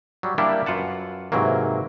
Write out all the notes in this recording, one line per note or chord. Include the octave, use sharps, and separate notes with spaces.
F#3 G3
G3 A#3 D4 E4 G4
F#2 F4 B4 F#5 A5
G#2 C3 E3 F#3 A#3